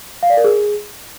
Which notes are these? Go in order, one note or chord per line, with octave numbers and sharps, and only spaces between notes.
F5
D5
A#4
G#4